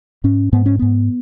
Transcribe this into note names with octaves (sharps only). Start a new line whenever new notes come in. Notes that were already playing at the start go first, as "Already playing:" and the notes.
G#2 C#4
G#2 B3
C#4
G#2 B3